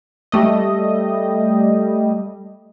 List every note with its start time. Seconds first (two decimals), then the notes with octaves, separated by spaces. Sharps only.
0.32 G3 A3 D#5